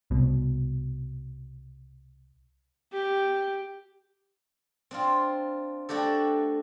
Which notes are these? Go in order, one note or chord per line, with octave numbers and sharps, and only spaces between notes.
C2 B2
G4
C4 D4 F4
A3 D4 F#4 G4 A4